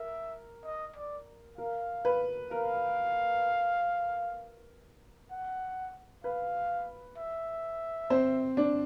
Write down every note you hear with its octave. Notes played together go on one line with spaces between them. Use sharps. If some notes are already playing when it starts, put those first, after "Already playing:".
Already playing: A#4 E5
D#5
D5
A#4 F5
B4
A#4 F5
F#5
B4 F5
E5
C4 C5
D4 D5